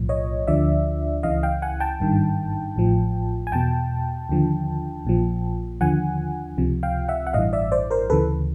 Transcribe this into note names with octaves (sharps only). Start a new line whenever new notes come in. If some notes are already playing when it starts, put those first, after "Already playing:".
Already playing: B1 A2 F3
C#5 D#5
D2 D3 F3 D5 E5
C#2 C#3 E3 D#5 F5
F5 G5
F#5 G#5
G5 A5
G#1 G2 D#3
A1 A2 F3
G#5
E2 B2 G5 A5
D#2 D3 F3
A#1 A#2 F3
D#2 D3 F3 F#5 G#5
C#2 C3 F3
F5 G5
E5 F#5
F#5
A1 G2 E3 D#5 F5
D5 E5
C5 D5
A#4 C5
D2 C#3 E3 A4 B4